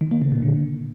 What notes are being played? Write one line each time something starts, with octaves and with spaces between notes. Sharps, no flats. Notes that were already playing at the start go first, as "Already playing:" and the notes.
D#3
A#3
C#3
A#2
D3